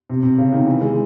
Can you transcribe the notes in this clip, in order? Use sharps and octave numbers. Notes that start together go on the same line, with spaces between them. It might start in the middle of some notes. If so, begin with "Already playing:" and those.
C3
C3
C#3
D#3
E3
G#3